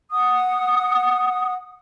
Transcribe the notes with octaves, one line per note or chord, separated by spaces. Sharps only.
F#5 D#6